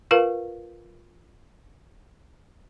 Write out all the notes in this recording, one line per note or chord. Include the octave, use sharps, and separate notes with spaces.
F4 A#4 B4 F5